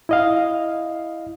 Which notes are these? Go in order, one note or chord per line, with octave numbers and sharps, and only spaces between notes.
E4 D#5 F5